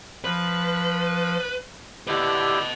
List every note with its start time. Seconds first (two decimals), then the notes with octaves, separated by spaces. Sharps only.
0.24 F3 B4
2.08 D3 E4 G4 B4 D#5